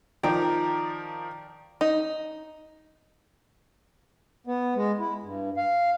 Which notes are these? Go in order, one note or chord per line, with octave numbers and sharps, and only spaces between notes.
D#3 F3 D5 G5 A#5
D#4
B3
G#3
E4
G2
F5